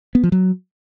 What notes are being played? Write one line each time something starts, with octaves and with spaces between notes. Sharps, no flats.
B3
F3
F#3